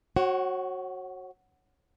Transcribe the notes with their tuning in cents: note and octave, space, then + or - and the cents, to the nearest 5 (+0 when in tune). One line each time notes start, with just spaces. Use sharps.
F#4 +0 C#5 -35 F#5 +40